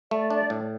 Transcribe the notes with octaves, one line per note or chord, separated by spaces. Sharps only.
A3 D5
D4 D5
A2